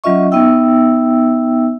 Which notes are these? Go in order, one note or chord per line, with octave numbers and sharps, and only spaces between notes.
F#3 C#4 F4 D#5 E5 C#6
B3 D#4 E5 G5 E6